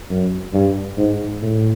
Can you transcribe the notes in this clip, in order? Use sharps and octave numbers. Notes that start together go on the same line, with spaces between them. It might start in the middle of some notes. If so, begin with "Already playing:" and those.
F#2
G2
G#2
A2